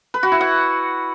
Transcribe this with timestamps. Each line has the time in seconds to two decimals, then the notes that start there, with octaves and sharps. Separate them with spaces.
0.14 B4
0.23 F#4
0.32 E4
0.41 F#5